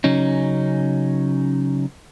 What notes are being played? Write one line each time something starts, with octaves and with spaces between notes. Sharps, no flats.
C#3 F#3 C#4 D#4